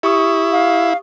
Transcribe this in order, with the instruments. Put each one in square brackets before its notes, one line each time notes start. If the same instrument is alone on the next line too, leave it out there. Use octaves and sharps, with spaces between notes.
[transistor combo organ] E4 [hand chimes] G4 C#6 D#6
[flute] F5